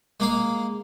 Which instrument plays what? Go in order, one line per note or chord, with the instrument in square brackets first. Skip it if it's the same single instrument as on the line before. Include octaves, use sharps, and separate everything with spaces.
[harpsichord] G#3 A#3 F5